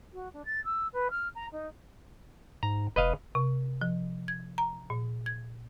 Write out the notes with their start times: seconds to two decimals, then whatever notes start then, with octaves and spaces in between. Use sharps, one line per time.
0.13 F#4
0.33 D4
0.45 A6
0.64 E6
0.93 B4
1.10 F6
1.35 A#5
1.52 D#4
2.63 G#2 A#5
2.96 F1 B4 D#5 F5
3.35 C3
3.81 F3
4.28 G#6
4.58 A#5
4.90 A#2
5.26 G#6